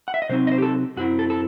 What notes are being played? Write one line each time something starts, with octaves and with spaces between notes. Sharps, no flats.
F#5
E5
D#5
C3 F#3 C4 D#4 C5
D#5
C5
G4
A4
F#2 F#3 C4 E4 F#4
A4
A4